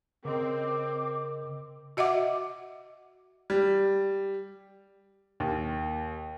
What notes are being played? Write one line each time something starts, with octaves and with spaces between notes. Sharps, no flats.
C#3 C4 A#4 D#5 D6
F#4 D#5 E5 F#5 D6
G3
D#2